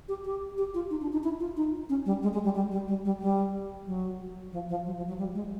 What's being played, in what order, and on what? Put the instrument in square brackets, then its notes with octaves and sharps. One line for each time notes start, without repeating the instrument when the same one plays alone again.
[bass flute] G4
G4
G4
F4
D#4
D4
D#4
E4
F4
D#4
C#4
G3
G#3
G#3
G3
G3
G3
G3
G3
G3
F#3
F3
F3
F#3
F3
F#3
G3
G#3